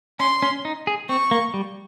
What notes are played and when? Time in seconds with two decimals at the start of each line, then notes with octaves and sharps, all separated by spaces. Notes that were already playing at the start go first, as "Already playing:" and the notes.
0.19 C#4 C6
0.42 C#4
0.65 D#4
0.87 G#4
1.09 C4 C#6
1.31 A#3
1.54 G3